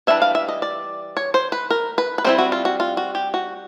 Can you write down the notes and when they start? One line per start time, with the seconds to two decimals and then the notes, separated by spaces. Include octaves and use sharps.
0.07 E3 G3 D4 E5
0.22 F5
0.35 E5
0.49 D#5
0.62 D5
1.17 C#5
1.34 C5
1.52 B4
1.70 A#4
1.98 B4
2.18 B4
2.24 G3 C4 E4 C5
2.38 F#4
2.52 F4
2.65 F#4
2.80 F4
2.97 F#4
3.15 G4
3.34 F#4